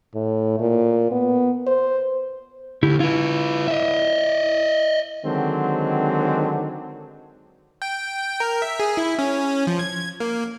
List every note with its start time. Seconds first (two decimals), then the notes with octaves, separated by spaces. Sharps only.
0.15 A2
0.60 A#2
1.11 B3
1.67 C5
2.83 D2 E4 G4
3.00 E4 F4 B4
3.68 D#5 E5
5.25 D3 D#3 F#3 G#3 C4
7.82 G5
8.40 A#4
8.62 E5
8.80 G#4
8.97 E4
9.19 C#4
9.67 F3
9.79 G#6
10.20 A#3